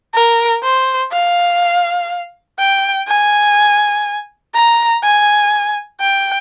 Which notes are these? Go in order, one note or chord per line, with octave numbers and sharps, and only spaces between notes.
A#4
C5
F5
G5
G#5
A#5
G#5
G5